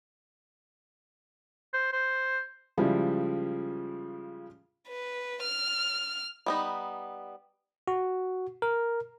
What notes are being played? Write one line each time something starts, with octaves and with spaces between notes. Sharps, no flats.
C5
C5
C#3 F3 G3 G#3 E4
B4
F6
G3 B3 D#4
F#4
A#4